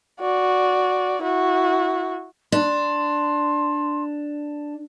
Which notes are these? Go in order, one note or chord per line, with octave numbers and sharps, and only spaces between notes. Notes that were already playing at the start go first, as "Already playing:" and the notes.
F#4 D5
E4 F#4
D4 C6